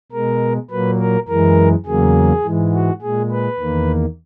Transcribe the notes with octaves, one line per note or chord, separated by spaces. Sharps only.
B2 G#3 A#4
A#2 F#3 A#3 B4
A#4
F#2 E3 G#3 A#4
E2 C#3 F#3 A#3 G#4
G#2 E3 G#3
F#4
A#2 G#3 G#4
B4
E2 D#3 A#3